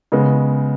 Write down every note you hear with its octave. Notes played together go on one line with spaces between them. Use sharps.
C#3 G#3 B3